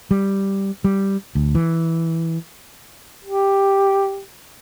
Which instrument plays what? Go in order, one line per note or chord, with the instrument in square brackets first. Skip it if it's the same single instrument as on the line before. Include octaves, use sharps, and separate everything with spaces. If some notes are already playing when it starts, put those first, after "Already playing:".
[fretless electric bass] G3
G3
D2
E3
[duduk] G4